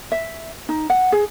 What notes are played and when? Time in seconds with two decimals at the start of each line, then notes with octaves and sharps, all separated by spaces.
0.12 E5
0.69 D#4
0.90 F#5
1.12 G#4